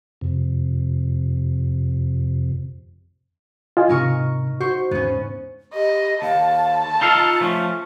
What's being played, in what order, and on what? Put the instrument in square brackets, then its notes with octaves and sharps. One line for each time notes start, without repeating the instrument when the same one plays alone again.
[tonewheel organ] F2 C3
[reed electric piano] F4 D#5 G#5
[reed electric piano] G#2 C3 [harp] D#4 A#4 C#6
[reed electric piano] F#4 [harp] C5 C#6
[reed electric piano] E2 G#2 [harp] B3 C#4
[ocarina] G4 [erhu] D#5
[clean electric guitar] D#2 [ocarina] F5 [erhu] A5
[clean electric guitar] D#4 A4 F5 [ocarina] F4
[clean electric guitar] F3 A3 C#4